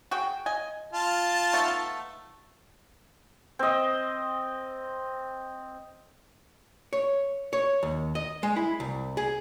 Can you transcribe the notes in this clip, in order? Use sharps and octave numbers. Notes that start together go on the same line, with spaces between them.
F#4 G#4 G5
D#5 G#5
F4 A5
A3 B3 D#4
C4 D#5
C#5
C#5
D#2
D#5
G#3
E4
C2
G#4